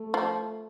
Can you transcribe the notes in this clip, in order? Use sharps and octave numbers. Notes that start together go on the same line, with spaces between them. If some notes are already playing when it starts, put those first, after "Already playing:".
Already playing: A3
F3